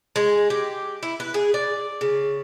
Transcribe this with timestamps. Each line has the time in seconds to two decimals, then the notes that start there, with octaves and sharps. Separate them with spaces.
0.16 G#3
0.50 G4
1.03 E4
1.20 B4
1.34 G#4
1.54 D5
2.01 C#3